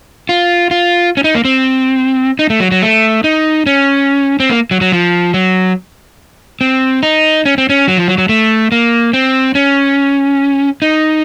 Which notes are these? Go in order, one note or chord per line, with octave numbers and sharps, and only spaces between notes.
F4
F4
C#4
D#4
A#3
C4
D#4
A3
F#3
F#3
A3
D#4
C#4
C4
A#3
F#3
F#3
F3
F#3
C4
D#4
C#4
C4
C#4
F#3
F3
F#3
F#3
A3
A#3
C4
C#4
D#4